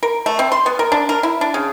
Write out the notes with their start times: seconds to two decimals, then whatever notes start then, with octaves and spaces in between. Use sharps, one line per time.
0.03 A#4
0.26 A3
0.39 C4
0.52 C6
0.66 B3
0.79 A#4
0.92 D4
1.09 A#4
1.23 E4
1.41 D4
1.54 C#3